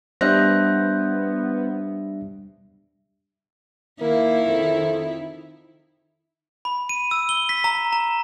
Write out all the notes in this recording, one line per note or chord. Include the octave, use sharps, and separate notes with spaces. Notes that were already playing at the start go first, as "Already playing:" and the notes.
G3 B3 D4 C5 D#5 E5 F#6 A#6
D#3 A#3 E4
F2
B5
D#7
E6
G7
B6
A#5
A#5